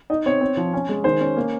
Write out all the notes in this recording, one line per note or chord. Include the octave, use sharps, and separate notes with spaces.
D#4 D#5
C4 C#5
C4
F3
C#4
G#3
D#3 C5
C#4
A#3